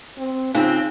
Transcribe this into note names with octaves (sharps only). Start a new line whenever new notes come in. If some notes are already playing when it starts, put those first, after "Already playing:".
C4
C#3 C4 D#4 F4